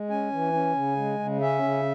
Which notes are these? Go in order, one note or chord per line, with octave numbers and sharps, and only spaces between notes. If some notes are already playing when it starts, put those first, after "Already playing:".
Already playing: G#3
C#4 G#5
E3
C#4
C#3
G#3
C#3
C#4 E5
C#3